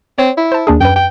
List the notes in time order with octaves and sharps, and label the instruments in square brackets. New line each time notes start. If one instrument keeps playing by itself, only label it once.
[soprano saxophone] C4 [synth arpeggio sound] C#5
[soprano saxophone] E4
[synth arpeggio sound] C5 A5
D#2 D4 G#4
[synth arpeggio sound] F#2 B4 [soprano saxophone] G5
[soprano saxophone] G5